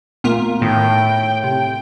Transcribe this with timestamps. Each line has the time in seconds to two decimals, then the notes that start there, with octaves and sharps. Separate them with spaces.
0.24 A#2 A3 B3 F4 A#4
0.62 A2 D#3 G5
1.44 C3 G5